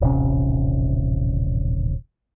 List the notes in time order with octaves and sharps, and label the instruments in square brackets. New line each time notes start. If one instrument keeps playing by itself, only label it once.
[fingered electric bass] D#1 A1 C3 C#4